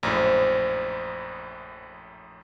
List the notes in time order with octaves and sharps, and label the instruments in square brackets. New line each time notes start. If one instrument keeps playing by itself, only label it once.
[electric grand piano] A#1 F#2 A2 [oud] F3 G#3